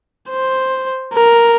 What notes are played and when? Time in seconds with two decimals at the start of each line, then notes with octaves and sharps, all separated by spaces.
0.31 C5
1.14 A#4